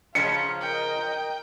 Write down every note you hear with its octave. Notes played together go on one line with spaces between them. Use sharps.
C#3 F3 C#4 F5 A#5 C#7
A#4 D#5 G5